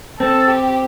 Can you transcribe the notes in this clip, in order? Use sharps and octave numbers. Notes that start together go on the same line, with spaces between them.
C4 A4
G4